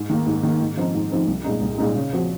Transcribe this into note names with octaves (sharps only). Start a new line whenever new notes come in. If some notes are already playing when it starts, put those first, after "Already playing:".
Already playing: G#2
D#3 A#3
G#2
D#3 A#3
G#2
F3 C4 D#4
G#2
F3 C4 D#4
C2
A#2 G#3 D#4
C2
A#2 G#3 D#4
C#3
F3 C4 F#4